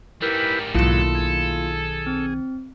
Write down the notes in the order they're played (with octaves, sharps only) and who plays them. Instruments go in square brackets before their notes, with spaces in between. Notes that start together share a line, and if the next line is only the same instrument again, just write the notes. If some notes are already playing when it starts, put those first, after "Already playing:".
[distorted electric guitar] G#2 G3 [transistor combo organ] E4 G4 B4 [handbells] A#4
[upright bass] B1 D#3 [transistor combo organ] G#2 F#3 [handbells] A#3 E4 F4 [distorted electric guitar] A4
[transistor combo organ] G#4
[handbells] C4